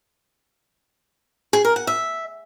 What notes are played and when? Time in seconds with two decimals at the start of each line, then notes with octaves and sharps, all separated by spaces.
1.53 G#4
1.65 A#4
1.76 F#5
1.87 E5